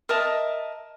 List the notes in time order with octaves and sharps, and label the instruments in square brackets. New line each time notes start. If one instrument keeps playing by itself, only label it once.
[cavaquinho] A#4 D#5 E5 A5